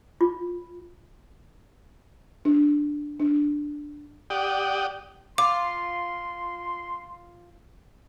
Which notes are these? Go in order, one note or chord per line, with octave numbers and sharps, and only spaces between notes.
F4
D4
D4
G4 D5 F#5 G5 D#6
F4 C6 D6